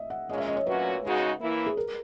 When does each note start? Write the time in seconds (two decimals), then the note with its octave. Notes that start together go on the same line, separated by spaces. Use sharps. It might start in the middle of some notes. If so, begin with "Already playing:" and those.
Already playing: D#5 E5
0.10 F#5
0.29 A#2 G#3 C#4 D#5
0.38 E5
0.47 D#5
0.57 C#5
0.66 A#2 F#3 C#4 F#4 B4
1.03 C#3 G#3 D#4 F#4
1.40 E3 A#3 E4
1.66 G#4
1.77 A#4